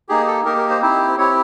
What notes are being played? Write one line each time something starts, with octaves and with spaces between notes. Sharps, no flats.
A#3 D#4 G4 G#4
A4
A#3 D#4 G4 A#4
A#4
C5
C4 E4 G4 C5
C4 E4 G4 C#5